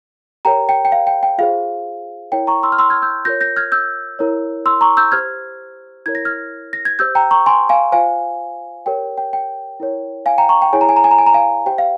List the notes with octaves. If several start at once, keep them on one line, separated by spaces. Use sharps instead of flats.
G4 A#4 C#5 G5 A#5
G5
G5
F5
G5
G5
F4 G#4 C5 F5
E4 A#4 C#5 G5
A#5 C#6
C6 E6
F6
C6 E6
F6 G#6
E6 G6
F4 A#4 C#5 G6 A#6
G6 A#6
F6 G#6
E6 G6
E4 A#4 C#5
C6 E6
A#5 C#6
E6 G6
G4 C5 F6 G#6
E4 A#4 C#5 G#6
A#6
F6 G#6
A#6
G#6
G4 C5 E6 G6
G5 A#5
A#5 C#6
G#5 C6
F5 G#5
F4 C5 F5 G#5
G4 A#4 C#5 G5
G5
G5
E4 A#4 C#5
F5 G#5
G5 A#5
A#5 C#6
G5
E4 G#4 C#5 G#5
A#5
G#5
A#5
G#5
A#5
G#5
A#5
F5 G#5
G4 C5 G5
F5